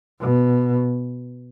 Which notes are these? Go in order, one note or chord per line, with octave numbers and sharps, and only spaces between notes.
B2